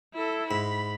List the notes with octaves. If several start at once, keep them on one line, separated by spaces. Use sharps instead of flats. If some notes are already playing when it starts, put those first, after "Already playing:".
E4 A4
G#2 B5